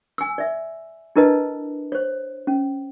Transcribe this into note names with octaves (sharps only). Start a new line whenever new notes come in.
G#5 E6
D5 E5
D4 E4 A#4 B4 D#5 A5
C5 C#5
C#4